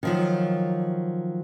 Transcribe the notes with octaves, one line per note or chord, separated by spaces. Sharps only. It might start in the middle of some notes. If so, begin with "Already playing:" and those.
D#3 F3 F#3